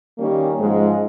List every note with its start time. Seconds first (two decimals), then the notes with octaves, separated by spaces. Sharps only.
0.19 D#3 G3 A#3 C#4
0.60 G#2 F3 G#3